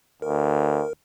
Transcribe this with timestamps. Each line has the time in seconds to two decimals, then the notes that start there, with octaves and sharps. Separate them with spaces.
0.22 D2 A#4